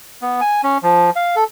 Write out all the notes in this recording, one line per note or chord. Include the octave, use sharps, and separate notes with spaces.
B3
G#5
C#4
F3
F5
A4